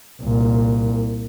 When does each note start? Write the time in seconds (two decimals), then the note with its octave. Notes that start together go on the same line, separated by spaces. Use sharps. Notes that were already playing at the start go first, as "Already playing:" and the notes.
0.22 C2 A#2